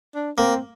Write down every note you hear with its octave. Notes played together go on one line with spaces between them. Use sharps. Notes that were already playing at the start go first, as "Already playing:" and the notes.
D4
A#3 C4